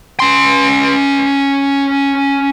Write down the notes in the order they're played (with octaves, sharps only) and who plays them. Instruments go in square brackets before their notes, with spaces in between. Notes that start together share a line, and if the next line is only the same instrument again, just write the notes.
[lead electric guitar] C#4 C6